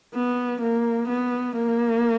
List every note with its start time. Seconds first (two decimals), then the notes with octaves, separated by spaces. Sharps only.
0.15 B3
0.61 A#3
1.08 B3
1.56 A#3